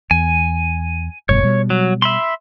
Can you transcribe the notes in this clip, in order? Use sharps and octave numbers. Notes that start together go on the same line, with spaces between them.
E2 G#5
F1 G2 B2 C#5
B2 G3
F#3
E5 B5 C6